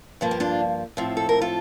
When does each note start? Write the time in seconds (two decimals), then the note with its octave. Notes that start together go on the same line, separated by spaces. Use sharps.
0.21 G2 F3 A#3
0.31 G4
0.40 D4 F4
0.97 A2 F3 C4
1.17 A4
1.29 A#4
1.41 F4 A4